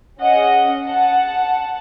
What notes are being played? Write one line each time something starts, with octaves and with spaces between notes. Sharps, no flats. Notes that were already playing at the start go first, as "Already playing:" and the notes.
C#4 G#4 D#5 F#5
F#5 A5